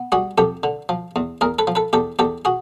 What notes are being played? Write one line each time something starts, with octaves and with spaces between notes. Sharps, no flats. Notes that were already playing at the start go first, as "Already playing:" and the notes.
Already playing: B3
G3 F#4 G#4
F2 G4 A4
D3
F3
E2
E2 G#4 A#4
A4 B4
F3
A4 B4
E2 G4 A4
E2 G4 A4
F#4 G#4